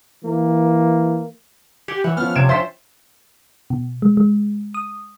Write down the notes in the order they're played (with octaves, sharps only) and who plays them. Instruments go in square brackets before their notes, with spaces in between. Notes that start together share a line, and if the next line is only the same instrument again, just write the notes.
[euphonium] E3 [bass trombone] A#3
[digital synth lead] G4 [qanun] F#5 G#5 C6
[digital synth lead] E3 [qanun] C#5 E5 F#5
[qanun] F3 C#4 [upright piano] B3 [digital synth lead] F6
[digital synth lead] C3 [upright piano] G#6 D7 E7
[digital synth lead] C5 [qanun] C#5 G5 A5 [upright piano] E5 C6 B6
[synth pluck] B2
G#3
G#3
D#6